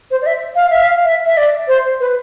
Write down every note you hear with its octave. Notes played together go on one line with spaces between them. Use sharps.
C5
D5
E5
F5
E5
F5
E5
E5
D5
C5
B4